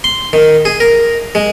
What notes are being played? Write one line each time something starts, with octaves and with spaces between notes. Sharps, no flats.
C6
D#3
G#4
A#4
G#3